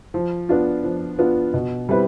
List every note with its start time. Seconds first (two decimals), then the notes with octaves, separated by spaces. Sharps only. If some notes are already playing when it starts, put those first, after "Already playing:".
0.14 F3
0.49 B3 D4 F4
0.84 F3
1.19 B3 D4 F4
1.54 B2
1.89 G3 C4 E4 B4